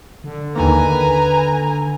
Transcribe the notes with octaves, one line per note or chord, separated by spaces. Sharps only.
D3
D#2 D#3 A#3 B4 G#5 A#5